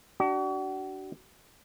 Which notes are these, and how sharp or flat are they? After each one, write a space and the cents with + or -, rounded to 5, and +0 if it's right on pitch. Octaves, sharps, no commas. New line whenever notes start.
D4 +5 F#4 +40